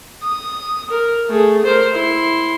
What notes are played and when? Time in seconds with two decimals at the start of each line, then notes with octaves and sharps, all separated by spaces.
0.23 D#6
0.91 A#4
1.29 A3 G#4
1.65 A#4 C5
1.93 E4 C6